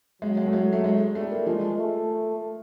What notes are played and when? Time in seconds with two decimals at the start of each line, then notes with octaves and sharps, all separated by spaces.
0.22 F#3 G#3
0.37 G#3
0.47 A3
0.53 G#3
0.73 A3
0.84 G#3
1.15 G3 A3
1.31 A#3
1.46 F3 G#3
1.78 A3